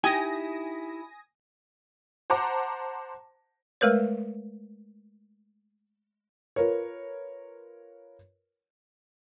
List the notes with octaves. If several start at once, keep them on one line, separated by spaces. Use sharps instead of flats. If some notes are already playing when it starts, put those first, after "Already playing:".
D#4 E4 G4 G5 G#5 D#6 A#6
C5 F#5 A5 A#5 D6
G#3 A3 A#4 B4 C#5
F4 A#4 B4 C#5